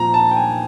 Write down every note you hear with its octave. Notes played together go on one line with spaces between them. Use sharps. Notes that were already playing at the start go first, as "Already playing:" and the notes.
Already playing: A#2 F3 A#5
A5
G5
G#5